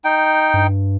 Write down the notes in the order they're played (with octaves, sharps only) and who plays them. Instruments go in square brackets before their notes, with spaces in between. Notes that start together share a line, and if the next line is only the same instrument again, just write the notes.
[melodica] D#4 G5
[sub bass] G2